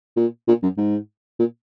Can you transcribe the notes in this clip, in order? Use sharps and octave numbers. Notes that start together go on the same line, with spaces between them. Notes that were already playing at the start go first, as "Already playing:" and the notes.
A#2
A#2
F#2
G#2
A#2